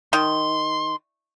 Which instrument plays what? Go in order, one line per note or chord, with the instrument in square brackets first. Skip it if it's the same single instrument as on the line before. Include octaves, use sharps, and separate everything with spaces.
[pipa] D#3 [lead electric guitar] C6